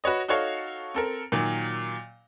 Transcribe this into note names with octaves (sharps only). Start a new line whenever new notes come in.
F#4 B4 C#5 D#5
D#4 F#4 A4 C#5 F5
C4 A4 A#4
A#2 D#3 F#3